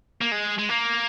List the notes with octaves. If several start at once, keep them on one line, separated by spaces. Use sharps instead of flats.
A#3
G#3
G#3
A#3